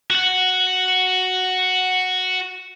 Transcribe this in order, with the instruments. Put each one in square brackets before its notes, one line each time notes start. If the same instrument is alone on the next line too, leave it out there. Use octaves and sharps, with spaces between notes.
[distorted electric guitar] F#4 F#5